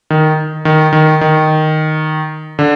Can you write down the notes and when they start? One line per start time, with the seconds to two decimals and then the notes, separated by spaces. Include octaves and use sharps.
0.10 D#3
0.65 D#3
0.93 D#3
1.21 D#3
2.59 D3